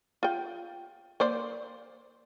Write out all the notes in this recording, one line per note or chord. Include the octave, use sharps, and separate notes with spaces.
F4 G5
A#3 C5 D5